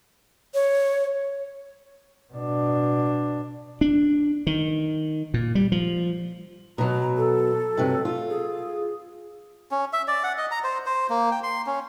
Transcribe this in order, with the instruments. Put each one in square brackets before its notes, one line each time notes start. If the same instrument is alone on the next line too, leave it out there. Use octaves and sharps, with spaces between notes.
[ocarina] C#5
[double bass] B2 D4
[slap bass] D4
D#3
A#2
G3
F3
[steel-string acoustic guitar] B2 F#3 [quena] A#5
[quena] A4
[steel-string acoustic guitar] G2 C3 F#3
F4
[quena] G#4
[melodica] C#4
E5
D5
F#5
D#5
A#5
C5
C5
A#3
G5
C6
C#4